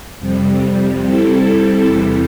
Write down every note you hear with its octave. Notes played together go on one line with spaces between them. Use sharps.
F2 C3 G3
G3 C4 E4 A4
E2 C3 E3 G3